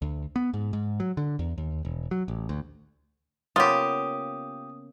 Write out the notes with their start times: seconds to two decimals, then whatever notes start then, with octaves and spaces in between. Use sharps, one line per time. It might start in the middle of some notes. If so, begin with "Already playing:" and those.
0.02 D2
0.36 B3
0.54 G#2
0.73 G#2
1.00 F#3
1.17 D3
1.39 E2
1.58 D#2
1.85 E1
2.11 F#3
2.28 A1
2.49 D2
3.56 C#3 A#3 B3 F4 G4 D#6